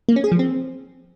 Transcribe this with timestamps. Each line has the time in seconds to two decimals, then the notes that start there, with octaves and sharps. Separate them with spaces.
0.09 A#3
0.16 C#4
0.24 G#4
0.32 F3
0.39 C4